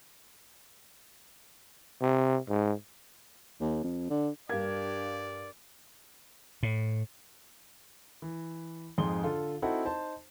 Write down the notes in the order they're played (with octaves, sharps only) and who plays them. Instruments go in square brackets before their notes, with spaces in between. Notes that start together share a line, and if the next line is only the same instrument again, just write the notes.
[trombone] C3
G#2
[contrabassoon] D#2
F2
D3
[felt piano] G2 F5 G#6 [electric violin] D4 G4 [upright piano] A#4 [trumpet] D5
[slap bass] A2
[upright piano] E3
F2 G#2 G#4 C6 G7
D3 F4 A4
C4 D#4 E4 F#4 A4 F#5
D#4 C5 A5